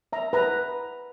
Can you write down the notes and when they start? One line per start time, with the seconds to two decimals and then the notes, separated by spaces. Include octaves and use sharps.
0.13 E5 A#5
0.33 B4 A#5